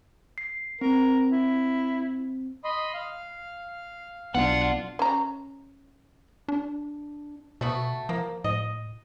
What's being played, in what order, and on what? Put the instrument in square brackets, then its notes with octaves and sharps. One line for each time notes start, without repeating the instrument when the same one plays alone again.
[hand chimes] C7
[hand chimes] C4 [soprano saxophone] A#4
[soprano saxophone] E4
[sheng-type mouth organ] D#5 B5 C6
F5
[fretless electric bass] B1 B3 [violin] D4 F4 [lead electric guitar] F#5
[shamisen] C#4 A#5
[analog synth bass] D4
[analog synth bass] B2 [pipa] A3 B3 F#4
[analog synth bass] F3 [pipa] A#3
[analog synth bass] A2 [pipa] D#5